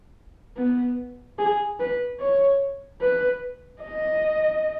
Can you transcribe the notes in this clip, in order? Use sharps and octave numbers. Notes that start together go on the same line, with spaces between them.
B3
G#4
B4
C#5
B4
D#5